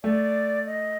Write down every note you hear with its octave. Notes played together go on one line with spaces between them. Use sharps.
A3 D5
D#5